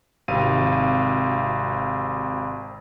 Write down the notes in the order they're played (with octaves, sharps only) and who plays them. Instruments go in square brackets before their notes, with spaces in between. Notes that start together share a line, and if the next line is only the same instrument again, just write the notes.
[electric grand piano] G#1 C3 F5 D#7